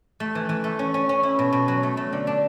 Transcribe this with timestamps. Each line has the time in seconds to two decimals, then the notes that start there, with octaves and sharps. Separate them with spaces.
0.20 A3
0.35 E3
0.49 E3
0.64 A3
0.79 C#4
0.94 C#4
1.09 C#4
1.23 E4
1.39 B2
1.53 B2
1.68 F#3
1.83 A3
1.97 A3
2.13 D3
2.27 D4